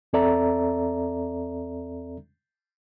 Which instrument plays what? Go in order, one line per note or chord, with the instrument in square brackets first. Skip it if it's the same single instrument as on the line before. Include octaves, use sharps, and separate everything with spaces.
[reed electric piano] E2 C4 A4 D5 E5 A#5